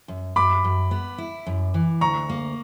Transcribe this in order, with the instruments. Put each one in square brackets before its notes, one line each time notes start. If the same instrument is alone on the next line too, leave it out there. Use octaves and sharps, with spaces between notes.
[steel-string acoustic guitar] F#2
[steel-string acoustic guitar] F#2 [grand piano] B5 D6
[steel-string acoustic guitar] F#2
B3
E4
F#2
E3
[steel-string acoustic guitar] D2 [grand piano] A#5 C#6
[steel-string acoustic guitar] A#3